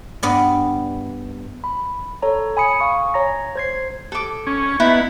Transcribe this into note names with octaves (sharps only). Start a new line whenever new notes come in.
G2 B3 D5
B5
A4 C#5 A#5
G#5 B5 D#6 C#7
F5 G#5 C#6
C#5 A#5 A#6
C5 G#6 C7
A4 D6
C#4
B3 D#4 E4